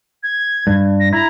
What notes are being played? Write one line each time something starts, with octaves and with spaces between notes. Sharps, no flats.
G#6
G2
A#6
E4 A#5